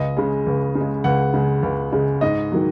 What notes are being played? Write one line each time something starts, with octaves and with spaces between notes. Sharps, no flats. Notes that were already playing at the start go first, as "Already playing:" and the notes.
Already playing: C#2 D#5
C#3 G#3
C#2
C#3
G#3
C#2 F#5
C#3 G#3
C#2
C#3 G#3
G#2 D#5
D#3 F#3